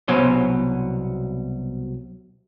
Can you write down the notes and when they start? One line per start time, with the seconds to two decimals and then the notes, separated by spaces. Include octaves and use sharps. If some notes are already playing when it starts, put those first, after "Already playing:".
0.08 C2 B2 F#3 C#4 C5